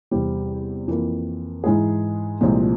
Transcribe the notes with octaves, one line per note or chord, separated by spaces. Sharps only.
E2 C3 G3 C4
F2 E3 A#3
G#2 E3 G#3 E4 G#4
C2 A#2 F3 G#3